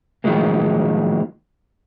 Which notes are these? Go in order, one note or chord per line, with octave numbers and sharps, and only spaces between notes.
A2 D#3 F3 F#3 G#3 A#3